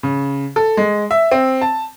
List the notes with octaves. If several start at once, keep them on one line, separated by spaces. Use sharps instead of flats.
C#3
A4
G#3
E5
C4
A5